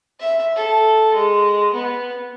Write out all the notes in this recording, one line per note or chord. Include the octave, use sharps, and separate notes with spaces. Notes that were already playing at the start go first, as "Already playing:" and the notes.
E5
A4
G#3
B3